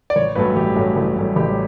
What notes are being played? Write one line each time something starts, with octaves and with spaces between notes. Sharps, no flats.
D5
A1 C#5
G2 F#3 A3 C#4 B4
A1 G4
G2 F#3 A3 C#4
A1
G2 F#3 A3 C#4
A1 G4